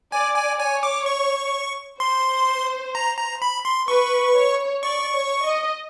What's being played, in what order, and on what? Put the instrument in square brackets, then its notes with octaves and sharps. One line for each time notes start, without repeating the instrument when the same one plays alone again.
[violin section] D5 [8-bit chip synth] G#5
[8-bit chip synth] G#5
[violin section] C#5 [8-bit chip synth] G#5
[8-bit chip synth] D6
C#6
[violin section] C5 [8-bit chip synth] C6
[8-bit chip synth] A#5
A#5
B5
C6
[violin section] B4 [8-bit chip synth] C#6
[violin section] C#5
[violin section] D5 [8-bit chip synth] C#6
[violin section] C#5
D#5